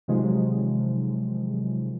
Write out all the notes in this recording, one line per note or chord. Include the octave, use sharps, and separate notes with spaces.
C3 D#3 F3 F#3 G#3